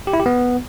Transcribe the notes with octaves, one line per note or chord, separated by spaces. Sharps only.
G4
E4
G4
B3